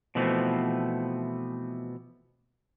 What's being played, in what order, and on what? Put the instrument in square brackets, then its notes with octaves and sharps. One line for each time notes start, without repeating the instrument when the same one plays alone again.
[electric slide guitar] B2 E3 F3 A3 B3 C4